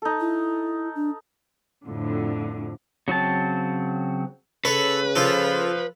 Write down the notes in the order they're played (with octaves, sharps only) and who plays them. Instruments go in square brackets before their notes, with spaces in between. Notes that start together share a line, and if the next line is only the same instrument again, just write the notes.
[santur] D#4 A4
[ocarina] E4
D4
[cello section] F2 A2 D3
[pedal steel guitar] C#3 F#3 C4 A5
[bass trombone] C#3 [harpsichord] A4 C#5 [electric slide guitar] B4
[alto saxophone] F3 [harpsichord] F4 A4